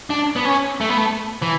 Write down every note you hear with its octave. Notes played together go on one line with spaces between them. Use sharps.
D4
B3
C#4
A3
B3
A3
E3